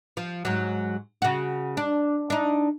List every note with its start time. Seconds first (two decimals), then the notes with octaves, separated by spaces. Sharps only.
0.17 F3
0.45 G#2 F#3
1.22 C#3 F#4
1.77 D4
2.30 D4 D#4